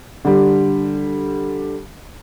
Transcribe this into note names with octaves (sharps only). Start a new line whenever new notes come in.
D3 G3